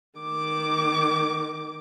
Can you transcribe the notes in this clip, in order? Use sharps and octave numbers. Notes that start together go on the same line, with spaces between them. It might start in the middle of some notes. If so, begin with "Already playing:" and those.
D#3 D6